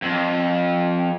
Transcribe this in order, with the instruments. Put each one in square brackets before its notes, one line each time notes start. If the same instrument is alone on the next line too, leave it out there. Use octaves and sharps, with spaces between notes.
[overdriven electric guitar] F2